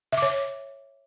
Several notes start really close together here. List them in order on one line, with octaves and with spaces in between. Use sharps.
E5 D6 C#5